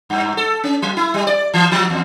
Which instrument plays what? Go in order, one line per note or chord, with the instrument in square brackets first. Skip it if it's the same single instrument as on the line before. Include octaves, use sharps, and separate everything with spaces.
[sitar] G2
A4
C#4
F#3
E4
G3
D5
E3
F3
E2